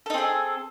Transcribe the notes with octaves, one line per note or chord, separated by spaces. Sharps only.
C4 D#4 G#4 A4